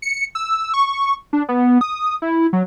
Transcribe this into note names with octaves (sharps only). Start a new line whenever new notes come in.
C#7
E6
C#6
D4
B3
D#6
E4
F#3